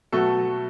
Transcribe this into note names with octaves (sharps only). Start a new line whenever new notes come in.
B2 F#3 A3 F#4 A4